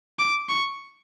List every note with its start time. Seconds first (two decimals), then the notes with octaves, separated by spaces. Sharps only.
0.19 D6
0.49 C#6